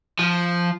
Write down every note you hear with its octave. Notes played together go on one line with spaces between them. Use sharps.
F3